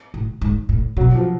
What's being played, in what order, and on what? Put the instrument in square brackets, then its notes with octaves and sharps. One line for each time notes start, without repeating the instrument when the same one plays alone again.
[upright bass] A2
G#2
A2
[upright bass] B2 [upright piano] F#3
[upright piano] F3